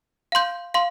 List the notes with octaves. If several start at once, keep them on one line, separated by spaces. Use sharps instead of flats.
F5 C6 G6
F5 C6